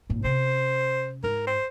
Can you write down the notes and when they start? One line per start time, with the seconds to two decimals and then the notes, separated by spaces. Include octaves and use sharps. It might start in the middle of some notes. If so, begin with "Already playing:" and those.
0.10 G#1 A#2
0.24 C3 C#4 C5
1.24 G#2 A#4
1.47 C5